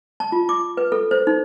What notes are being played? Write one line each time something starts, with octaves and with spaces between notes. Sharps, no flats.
A5
F4
D6
B4
A4
C5
D#4